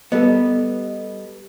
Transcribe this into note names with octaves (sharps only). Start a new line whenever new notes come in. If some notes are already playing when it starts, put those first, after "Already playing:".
G3 B3 A4 D#5